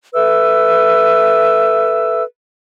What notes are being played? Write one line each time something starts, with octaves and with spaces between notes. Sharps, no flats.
A4 B4 E5 E6